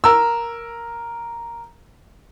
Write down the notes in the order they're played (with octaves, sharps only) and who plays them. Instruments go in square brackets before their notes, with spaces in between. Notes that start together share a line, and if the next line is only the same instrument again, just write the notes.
[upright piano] A#4 E6